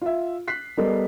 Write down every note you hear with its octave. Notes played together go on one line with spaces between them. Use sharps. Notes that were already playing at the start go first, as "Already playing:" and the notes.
F4 E5
F#6 B6 C7
G3 B3 A4 A#4 D#5